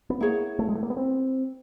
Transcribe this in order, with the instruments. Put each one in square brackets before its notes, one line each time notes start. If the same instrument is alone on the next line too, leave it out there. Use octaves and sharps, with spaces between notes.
[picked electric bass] B3
[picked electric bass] A#3 [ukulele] E4 G#4 C#5 F#5
[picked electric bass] A3
G#3
A3
A#3
B3
C4